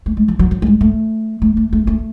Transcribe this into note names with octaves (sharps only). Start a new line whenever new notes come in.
A3
G#3
F3
F#3
F#3
A3
G#3
A3
A3
A3
A3
A3